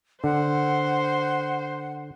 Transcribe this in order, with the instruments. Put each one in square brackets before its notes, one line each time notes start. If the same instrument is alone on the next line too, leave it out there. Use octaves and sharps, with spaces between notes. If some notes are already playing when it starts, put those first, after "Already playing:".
[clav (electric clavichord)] D3 [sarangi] C5 [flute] F#5